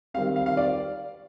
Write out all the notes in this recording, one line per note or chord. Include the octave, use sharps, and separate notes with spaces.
D#3 G3 C4 F5
F5
F5
D5